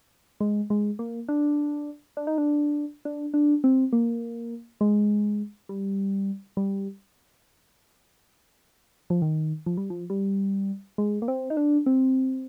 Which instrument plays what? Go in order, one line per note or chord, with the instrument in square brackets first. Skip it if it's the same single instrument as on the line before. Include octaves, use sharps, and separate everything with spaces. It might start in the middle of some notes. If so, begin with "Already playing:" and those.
[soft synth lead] G#3
G#3
A#3
D4
D4
D#4
D4
D4
D4
C4
A#3
G#3
G3
G3
F3
D#3
F3
G3
F3
G3
G#3
A#3
C4
D#4
D4
C4